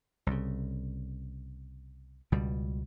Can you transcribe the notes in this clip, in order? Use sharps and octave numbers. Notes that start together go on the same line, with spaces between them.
C2 C#3
C#2 B2 G3